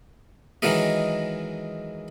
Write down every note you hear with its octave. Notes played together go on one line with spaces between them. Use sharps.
D#3 E3 F#3 G#3 A#4 D#5